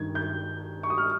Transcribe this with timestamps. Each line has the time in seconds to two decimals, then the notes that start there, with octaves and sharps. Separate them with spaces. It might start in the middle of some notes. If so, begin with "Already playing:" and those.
Already playing: G2 D#3 G#6
0.15 G6
0.83 C#6
0.90 D#6
0.98 F6